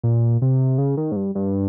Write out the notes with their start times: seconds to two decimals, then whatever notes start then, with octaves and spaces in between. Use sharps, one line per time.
0.03 A#2
0.42 C3
0.78 C#3
0.97 D#3
1.12 G#2
1.16 G2
1.35 G2